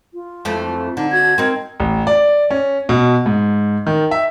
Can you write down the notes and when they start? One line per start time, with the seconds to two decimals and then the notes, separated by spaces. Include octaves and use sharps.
0.14 F4
0.45 F2 E3 A3
0.97 D3 D#4
1.12 F#4 G#6
1.38 C4 D#4 A#4
1.80 A1
2.07 D5
2.51 C#4
2.89 B2
3.26 G#2
3.87 D#3
4.11 E5